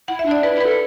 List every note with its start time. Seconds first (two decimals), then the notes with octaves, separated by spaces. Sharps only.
0.08 E4 F#5
0.19 E5
0.25 D4
0.31 D5
0.43 E4 B4
0.55 E4
0.61 B4
0.66 A4